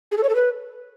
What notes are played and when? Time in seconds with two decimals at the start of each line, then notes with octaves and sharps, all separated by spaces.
0.12 G#4
0.17 A4
0.23 C#5
0.29 A4
0.35 B4